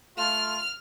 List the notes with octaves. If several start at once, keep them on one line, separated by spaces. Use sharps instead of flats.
A3 F4 F6